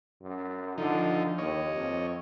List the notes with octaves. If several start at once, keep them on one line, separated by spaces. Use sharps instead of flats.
F#2
D3 F3 D#4
D#2 C#5 D#5
F2